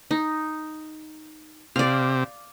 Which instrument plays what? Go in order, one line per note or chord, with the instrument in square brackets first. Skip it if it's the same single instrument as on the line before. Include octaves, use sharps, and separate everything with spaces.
[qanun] D#4
[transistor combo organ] C3 [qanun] D5 F5